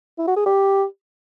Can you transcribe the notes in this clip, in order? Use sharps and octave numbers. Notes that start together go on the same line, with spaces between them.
E4
F#4
G#4
G4